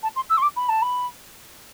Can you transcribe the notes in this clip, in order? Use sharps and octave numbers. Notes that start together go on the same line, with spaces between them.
A5
C6
E6
C6
D6
B5
A5
B5